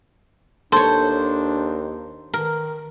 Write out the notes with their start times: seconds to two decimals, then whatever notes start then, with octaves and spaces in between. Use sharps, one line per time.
0.72 D#2 D4 A4 C5 C#5
2.34 D#3 A#4